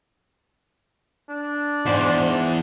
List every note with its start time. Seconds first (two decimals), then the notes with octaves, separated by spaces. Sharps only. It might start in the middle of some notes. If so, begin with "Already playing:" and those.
1.30 D4
1.86 E2 G#2 C5 D5